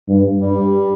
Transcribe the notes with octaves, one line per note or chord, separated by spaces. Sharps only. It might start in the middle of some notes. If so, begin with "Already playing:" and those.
G2
G2 G3